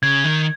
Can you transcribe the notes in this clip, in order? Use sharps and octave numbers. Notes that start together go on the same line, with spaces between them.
C#3 G#6
D#3